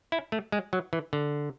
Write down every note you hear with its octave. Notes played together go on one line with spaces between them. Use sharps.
E4
A3
G#3
F#3
E3
D3